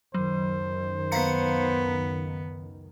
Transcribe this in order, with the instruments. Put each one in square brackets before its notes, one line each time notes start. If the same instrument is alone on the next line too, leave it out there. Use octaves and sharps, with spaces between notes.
[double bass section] C#2 F#2 D#3 [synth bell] F#3 [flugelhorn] C5
[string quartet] B3 [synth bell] F5 A#5 C#7